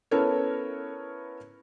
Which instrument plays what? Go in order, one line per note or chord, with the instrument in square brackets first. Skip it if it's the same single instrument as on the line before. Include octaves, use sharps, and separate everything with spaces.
[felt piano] B3 C#4 E4 A4 A#4 C#5